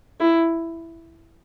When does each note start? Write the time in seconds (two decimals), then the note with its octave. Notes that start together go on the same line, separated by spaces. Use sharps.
0.20 E4